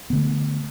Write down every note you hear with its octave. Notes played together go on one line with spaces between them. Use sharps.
D3 A3 B3